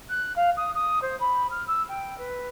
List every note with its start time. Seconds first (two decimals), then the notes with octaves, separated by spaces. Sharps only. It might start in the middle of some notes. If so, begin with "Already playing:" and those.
0.09 F#6
0.36 F5
0.57 D#6
0.75 D#6
1.02 C5
1.20 B5
1.50 F6
1.67 E6
1.88 G5
2.18 B4